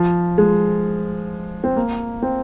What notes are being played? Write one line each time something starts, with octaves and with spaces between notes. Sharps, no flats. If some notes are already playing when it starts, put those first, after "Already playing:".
Already playing: F3
G#3
C4
A#3
C4